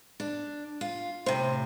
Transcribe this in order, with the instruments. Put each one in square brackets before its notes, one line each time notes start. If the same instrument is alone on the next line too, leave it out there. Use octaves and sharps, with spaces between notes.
[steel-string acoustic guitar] D4
F4
[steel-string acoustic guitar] A2 C3 [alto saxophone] C5